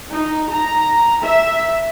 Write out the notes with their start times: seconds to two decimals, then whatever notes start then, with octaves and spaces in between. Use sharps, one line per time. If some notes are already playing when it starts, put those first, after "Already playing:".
0.11 D#4
0.51 A#5
1.24 E5